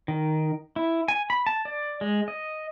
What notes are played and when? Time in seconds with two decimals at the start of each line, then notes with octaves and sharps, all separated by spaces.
0.08 D#3
0.76 E4
1.08 G#5
1.30 B5
1.47 A5
1.65 D5
2.01 G#3
2.28 D#5